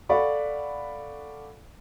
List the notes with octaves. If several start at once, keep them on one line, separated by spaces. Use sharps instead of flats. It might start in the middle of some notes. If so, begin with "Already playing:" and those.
A4 D5 F5 F#5 B5 C#6